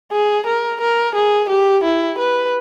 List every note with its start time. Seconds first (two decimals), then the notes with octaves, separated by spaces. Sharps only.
0.12 G#4
0.46 A#4
0.81 A#4
1.15 G#4
1.49 G4
1.84 E4
2.18 B4